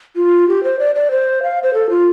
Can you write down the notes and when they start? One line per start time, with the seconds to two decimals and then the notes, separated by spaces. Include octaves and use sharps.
0.16 F4
0.48 G4
0.63 C5
0.79 D5
0.95 D5
1.11 C5
1.43 F5
1.63 C5
1.74 A4
1.90 F4